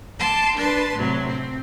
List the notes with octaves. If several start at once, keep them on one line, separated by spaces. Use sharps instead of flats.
A5 C6 D6
D4 B4 A5 C6
A2 C3 F#3
C4